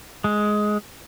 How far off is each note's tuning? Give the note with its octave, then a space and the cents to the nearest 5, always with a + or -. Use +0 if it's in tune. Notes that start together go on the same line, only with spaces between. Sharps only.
G#3 +10